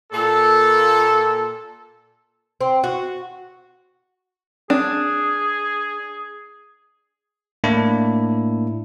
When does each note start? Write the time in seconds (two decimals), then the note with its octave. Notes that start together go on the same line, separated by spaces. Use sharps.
0.13 A#2 A4
2.61 C4
2.84 F#4
4.70 D4 G#4
7.64 A2 A#3 D4 E4